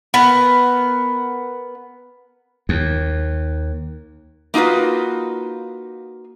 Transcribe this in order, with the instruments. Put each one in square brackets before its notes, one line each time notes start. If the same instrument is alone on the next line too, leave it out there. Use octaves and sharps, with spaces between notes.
[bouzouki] B3 A#4
[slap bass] D#2
[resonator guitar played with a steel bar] A#3 D#4 F4 F#4 B4